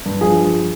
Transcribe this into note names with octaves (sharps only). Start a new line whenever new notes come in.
G2
F3 G#4